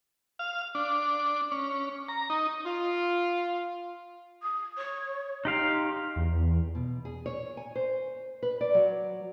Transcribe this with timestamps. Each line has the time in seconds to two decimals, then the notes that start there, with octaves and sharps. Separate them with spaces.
0.39 F5
0.75 D4
1.52 C#4
2.09 A#5
2.30 D#4
2.64 F4
4.42 D#6
4.78 C#5
5.45 D#4 G4 F5 C6
6.16 E2
6.75 B2
7.05 G#4
7.26 C#5
7.57 G#5
7.75 C5
8.43 B4
8.61 D5
8.75 F#3